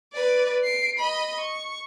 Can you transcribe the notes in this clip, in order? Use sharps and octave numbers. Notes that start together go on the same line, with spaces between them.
B4 D5
C7 D7
D#5 B5
C#6